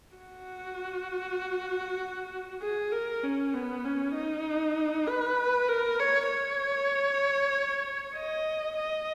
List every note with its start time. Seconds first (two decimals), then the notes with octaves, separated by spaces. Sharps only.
0.16 F#4
2.62 G#4
2.92 A#4
3.23 C#4
3.54 B3
3.85 C#4
4.15 D#4
5.07 B4
5.69 A#4
6.00 C#5
6.31 C#5
8.15 D#5
8.76 D#5